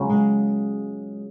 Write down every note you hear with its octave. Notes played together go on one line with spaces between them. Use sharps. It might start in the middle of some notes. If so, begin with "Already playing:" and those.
Already playing: C#2 C#3 F#3 C#4
G#3